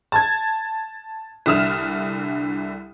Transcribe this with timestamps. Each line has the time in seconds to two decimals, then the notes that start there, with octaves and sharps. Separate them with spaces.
0.12 A5 G#6
1.46 C2 D3 E4 D#6 F6 E7